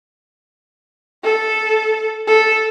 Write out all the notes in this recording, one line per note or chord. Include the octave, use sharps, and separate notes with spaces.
A4
A4